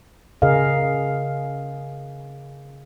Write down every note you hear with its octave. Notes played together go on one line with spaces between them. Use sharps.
C#3 G#4 A#4 D#5 F5